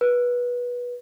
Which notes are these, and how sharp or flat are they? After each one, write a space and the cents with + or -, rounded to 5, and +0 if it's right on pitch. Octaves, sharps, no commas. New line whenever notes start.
B4 -20